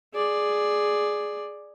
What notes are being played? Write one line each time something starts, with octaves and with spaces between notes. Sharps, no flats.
G#4 D5